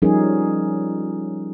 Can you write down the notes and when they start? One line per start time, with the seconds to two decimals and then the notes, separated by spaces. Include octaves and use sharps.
0.02 F3 G3 C#4 D#4 G#4 A#4